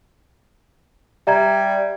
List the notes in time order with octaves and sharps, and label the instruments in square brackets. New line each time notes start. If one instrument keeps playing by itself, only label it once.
[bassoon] G3 [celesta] E5 A#5 G#6